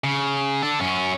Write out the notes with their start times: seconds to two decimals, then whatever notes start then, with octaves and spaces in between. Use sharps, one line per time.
0.04 C#3
0.62 D4 A4
0.80 F#2 C#4